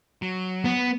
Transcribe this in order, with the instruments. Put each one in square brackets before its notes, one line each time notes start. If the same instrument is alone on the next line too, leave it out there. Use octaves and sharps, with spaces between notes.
[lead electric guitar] F#3
[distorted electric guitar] B3